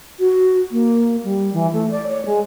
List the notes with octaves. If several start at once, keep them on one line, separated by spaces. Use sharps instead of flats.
F#4
A#3
G3
E3
A3
D5
C#5
G#3